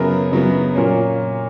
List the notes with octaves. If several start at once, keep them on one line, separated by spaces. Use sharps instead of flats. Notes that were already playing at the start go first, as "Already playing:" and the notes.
Already playing: F#2 C#3 F#3 B3 A#4
F#2 C#3 F#3 B3
A#2 F#3 A#3 C#4